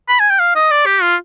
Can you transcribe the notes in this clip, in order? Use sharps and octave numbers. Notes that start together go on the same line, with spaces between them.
B5
G#5
G5
F5
D#5
D5
G4
F4